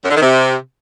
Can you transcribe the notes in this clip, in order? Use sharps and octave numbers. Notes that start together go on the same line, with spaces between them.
F#2
D3
D#3
C3